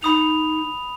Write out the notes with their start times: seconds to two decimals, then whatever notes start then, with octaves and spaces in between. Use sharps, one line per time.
0.03 D#4 B5 D#6 F7